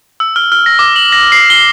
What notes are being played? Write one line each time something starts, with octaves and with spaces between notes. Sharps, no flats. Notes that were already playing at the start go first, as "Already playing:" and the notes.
E6
F6
F6
A#6
D6
F#7
A#6
C7
G7